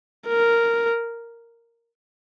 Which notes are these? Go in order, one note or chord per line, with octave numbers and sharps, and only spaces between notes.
A#4